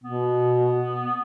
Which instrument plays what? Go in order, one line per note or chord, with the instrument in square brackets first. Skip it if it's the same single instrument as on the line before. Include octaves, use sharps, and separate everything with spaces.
[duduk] B2 [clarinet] B3